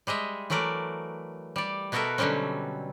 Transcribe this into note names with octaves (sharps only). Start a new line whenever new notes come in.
G3 G#3 D#5 E5
E3 F#3 A3 A#4 D5
G3 D5
B2 B3 F#4 A4 A#4 E5
B2 D3 F#3 G3 C4 C#4